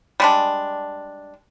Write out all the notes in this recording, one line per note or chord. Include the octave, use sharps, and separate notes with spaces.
G3 G#3 D4